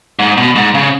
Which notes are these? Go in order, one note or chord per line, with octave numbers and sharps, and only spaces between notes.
G#2
B2
G#2
C#3